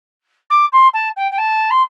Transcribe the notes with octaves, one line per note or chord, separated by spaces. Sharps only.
D6
C6
A5
G5
G5
A5
C6